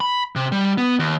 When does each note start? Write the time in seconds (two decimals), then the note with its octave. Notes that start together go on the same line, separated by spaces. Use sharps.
0.01 B5
0.36 C3
0.52 G3
0.78 B3
0.99 D#2